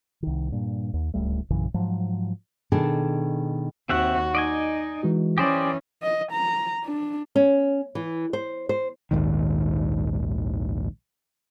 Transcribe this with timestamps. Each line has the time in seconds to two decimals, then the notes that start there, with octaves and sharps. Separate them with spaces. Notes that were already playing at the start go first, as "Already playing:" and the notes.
0.23 C2 D#3
0.52 G2 A#2
0.94 D#2
1.14 D1 C#2 G3 A3
1.50 A#1 F#2 C#3 E3
1.74 G#2 F3 F#3
2.72 B2 D#3 D4 G#4 A4
3.89 D#2 C4 F#4 E5 F#5
4.35 D#4 D5 D#5 G#5
5.03 E3 G#3 F#4
5.38 E3 C#4 G4 C5 D5 G#5 D#6 A#6
6.02 D#5
6.32 A#5
6.84 D4
7.36 C#4
7.95 E3
8.33 C5
8.69 C5
9.11 A#1 D#2 G#2 D#3